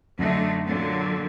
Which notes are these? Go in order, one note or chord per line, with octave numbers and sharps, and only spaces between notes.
F#2 D3 A3 D#4
A#2 D3 F#3